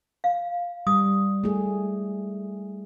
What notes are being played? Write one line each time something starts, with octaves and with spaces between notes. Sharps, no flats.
F5
G3 D#6
A3 G#4